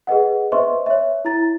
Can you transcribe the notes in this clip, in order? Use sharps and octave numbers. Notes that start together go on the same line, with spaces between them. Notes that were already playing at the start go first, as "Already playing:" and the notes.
G#4 B4 D#5 F#5
B4 C5 D#5 E5 C6 C#6
C#5 E5
E4 A#5 A6